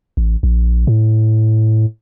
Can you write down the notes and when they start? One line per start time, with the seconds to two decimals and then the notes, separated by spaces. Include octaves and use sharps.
0.17 A1
0.43 A#1
0.87 A2